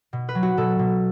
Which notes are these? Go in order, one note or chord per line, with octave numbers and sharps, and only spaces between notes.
B2
B4
F#3
F#4
B2 A4
B2